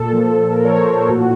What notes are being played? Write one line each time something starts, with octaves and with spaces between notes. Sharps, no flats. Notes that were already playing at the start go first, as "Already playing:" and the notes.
Already playing: A#2 A4
F3
A#2
A#2 A#4
C#5
F3 C5
A#2 C5
A2 F#4